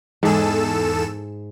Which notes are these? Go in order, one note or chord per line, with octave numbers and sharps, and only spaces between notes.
E2 G#2 G#4 A4 E7